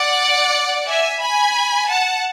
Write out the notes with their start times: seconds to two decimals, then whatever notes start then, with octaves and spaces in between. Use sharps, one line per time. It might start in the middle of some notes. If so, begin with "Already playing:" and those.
Already playing: D5 F#5
0.87 E5 G#5
1.21 G#5 B5
1.89 F#5 A5